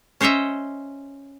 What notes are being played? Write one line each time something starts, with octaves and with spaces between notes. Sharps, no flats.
C#4 C5 C#5 D#5 E5